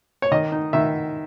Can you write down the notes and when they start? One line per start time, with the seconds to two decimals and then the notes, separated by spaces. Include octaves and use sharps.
0.22 C#5
0.31 D#3 D#5
0.52 D#4
0.73 D#3 E5